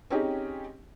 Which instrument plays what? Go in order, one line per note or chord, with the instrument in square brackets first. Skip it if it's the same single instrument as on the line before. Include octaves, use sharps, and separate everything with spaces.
[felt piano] C4 C#4 D#4 G4 G#4